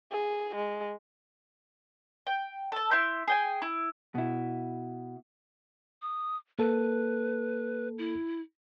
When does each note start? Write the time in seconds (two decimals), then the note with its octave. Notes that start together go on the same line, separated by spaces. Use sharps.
0.11 G#4
0.55 G#3
2.27 G5
2.72 A4 A5
2.91 E4 E5 C6 G6
3.28 G#4 G5 G#5
3.62 E4
4.15 B2 E4
6.02 D#6
6.59 A#3 A4 B4
7.98 E4